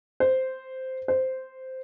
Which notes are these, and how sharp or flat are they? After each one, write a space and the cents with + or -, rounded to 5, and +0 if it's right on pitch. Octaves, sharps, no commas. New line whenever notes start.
C5 -5
C5 -5